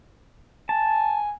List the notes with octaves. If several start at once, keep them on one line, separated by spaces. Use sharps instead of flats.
G#5 A5